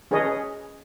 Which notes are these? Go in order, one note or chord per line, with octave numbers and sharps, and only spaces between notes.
C#4 G#4 B4 C#5 D#5